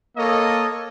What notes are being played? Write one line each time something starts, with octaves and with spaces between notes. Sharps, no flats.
A#3 A4 C#5 D#5